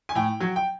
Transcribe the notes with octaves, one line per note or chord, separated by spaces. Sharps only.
G#5
A2 G5
F#3
G5